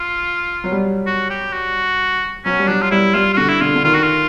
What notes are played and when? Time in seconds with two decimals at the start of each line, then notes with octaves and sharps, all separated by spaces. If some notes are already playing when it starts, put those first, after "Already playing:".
Already playing: F4
0.64 F#3
0.72 G3
1.06 F#4
1.30 G4
1.53 F#4
2.45 F#3 C#4
2.59 G3
2.68 F#3 D4
2.82 F4
2.91 G3 E4
3.14 G3 F4
3.34 F4
3.37 D3 F#4
3.49 E4
3.61 D3 F4
3.75 D3
3.84 D#3 F4
3.95 F#4
4.04 F4